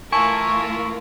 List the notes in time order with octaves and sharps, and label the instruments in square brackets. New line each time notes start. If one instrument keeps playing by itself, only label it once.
[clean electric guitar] E3 E4 [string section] A3 F4 A#4 [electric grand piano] G#5 A5 [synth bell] C#6